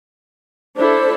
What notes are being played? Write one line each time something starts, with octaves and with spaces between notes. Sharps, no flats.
D4 E4 A4 C5